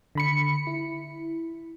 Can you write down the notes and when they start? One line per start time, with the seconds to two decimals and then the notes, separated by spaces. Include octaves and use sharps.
0.15 D3 B5 C#7
0.67 E4